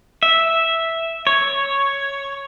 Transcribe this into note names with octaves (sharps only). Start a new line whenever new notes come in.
E5
C#5